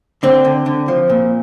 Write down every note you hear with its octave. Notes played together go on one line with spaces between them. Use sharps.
D3 C4
D3
D3
F3
A#2